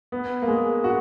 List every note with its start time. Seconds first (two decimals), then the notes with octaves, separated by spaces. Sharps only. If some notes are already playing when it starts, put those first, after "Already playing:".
0.12 B3
0.42 A#3
0.48 G#3
0.84 F#4